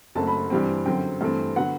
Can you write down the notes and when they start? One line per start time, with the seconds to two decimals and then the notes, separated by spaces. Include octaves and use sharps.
0.15 F#1 F#2 F#3 A3 C4 A5
0.27 B5
0.50 G2 E3 G3 C4
0.86 F#2 D3 F#3 C4 G5
1.21 G2 E3 A3 C4
1.56 D3 F#3 B3 F#5